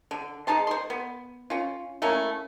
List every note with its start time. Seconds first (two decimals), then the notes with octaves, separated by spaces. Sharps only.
0.11 D3
0.47 G#3 D#4 A5 C6
0.67 C5 C6
0.90 B3
1.50 C#4 F4
2.02 A3 A#3 C#4 E4